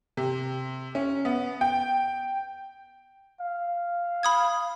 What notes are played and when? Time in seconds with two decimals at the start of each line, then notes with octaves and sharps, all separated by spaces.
0.17 C3
0.95 C#4
1.25 B3
1.61 G5
3.40 F5
4.23 B5 D#6 G#6